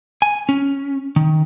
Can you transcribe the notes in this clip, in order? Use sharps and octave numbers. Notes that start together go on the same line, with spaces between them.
G#5
C#4
D#3